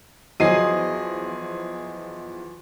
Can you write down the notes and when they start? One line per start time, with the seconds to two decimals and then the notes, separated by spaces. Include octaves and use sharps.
0.40 E2 F3 F#3 G#4 D#5 C7 D#7